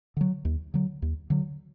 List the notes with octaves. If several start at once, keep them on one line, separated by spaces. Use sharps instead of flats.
D3 F#3
D#2
D3 F#3
D#2
D3 F#3